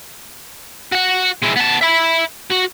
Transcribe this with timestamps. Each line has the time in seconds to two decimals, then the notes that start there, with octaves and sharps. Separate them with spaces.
0.92 F#4 F#5
1.43 G#3 E4
1.57 B3 A5
1.82 E5 B5
2.52 F#4